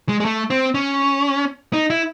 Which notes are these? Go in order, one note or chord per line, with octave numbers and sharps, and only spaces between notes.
G#3
G#3
A3
C4
C#4
D#4
E4